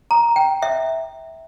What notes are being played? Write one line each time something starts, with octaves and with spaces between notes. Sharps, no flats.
A#5
G5
E5